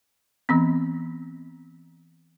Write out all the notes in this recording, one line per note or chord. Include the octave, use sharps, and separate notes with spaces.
E3 B3 C4